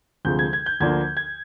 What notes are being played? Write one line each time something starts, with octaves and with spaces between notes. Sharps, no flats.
D2 C3 F3 G#3 G6
G#6
G#6
G6
D2 D3 F3 A#3 D4 G#6
G#6